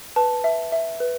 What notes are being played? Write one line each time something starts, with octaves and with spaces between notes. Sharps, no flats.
B4 A5
E5
E5
B4